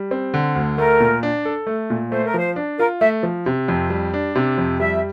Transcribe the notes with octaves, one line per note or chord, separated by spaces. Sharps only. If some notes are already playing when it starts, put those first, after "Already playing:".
Already playing: G3
C4
D3
D2
A3 A#4
A#2
D4
A4
A3
A#2
A3 C5
A#4
F3 C5
D4
F4 A#4
A3 E5
F3
C3
F2
G3
D4
C3
F2
G3 E5